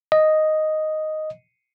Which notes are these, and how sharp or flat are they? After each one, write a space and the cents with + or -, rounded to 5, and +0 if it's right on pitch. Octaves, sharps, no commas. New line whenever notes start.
D#5 +0